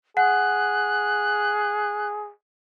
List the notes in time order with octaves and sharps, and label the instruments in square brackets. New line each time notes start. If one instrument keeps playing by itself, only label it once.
[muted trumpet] G#4 [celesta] F#5 [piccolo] F#6